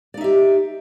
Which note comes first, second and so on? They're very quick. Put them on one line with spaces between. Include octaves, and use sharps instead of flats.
D5 D#4 E5 G4